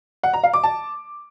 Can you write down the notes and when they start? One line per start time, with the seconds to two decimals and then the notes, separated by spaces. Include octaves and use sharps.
0.23 F#5
0.33 A#5
0.43 F5
0.53 D6
0.63 A5